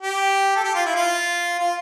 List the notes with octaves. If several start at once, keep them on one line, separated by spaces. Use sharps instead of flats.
G4
A4
G4
F4
E4
F4
F4